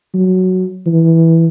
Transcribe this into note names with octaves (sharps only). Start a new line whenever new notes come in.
F#3
E3